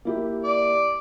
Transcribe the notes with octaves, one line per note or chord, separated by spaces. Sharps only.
A#3 E4 G4
D5